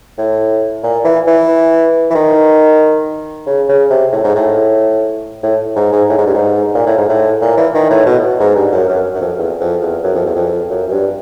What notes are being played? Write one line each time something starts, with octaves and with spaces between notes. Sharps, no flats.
A2
A#2
E3
E3
E3
D#3
C#3
C#3
C3
A2
G#2
A2
A2
G#2
G#2
A2
G#2
G2
G#2
A#2
A2
G#2
A2
A#2
E3
D#3
A2
B2
G#2
G2
F#2
F#2
F#2
F2
E2
F2
E2
F#2
F2
E2
F2
F#2
F#2
G2